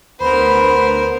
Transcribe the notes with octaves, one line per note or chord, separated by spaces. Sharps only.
D2 B3 A#4 C5 B5